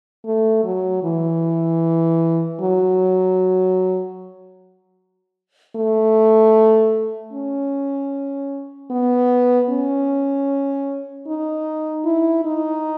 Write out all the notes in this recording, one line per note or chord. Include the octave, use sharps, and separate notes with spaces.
A3
F#3
E3
F#3
A3
C#4
B3
C#4
D#4
E4
D#4